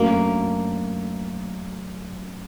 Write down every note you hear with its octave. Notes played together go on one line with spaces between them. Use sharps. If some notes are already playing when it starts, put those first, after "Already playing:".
Already playing: F#2 F#3 A3 A#3 D4